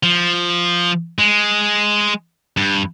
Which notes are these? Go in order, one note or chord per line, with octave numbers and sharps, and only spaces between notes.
F3
G#3
G2